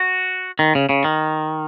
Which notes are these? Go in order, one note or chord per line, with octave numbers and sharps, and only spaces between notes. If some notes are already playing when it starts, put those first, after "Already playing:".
Already playing: F#4
D#3
C#3
C#3
D#3